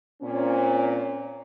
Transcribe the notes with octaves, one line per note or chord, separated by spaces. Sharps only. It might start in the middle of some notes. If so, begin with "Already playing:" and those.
A#2 C4 C#4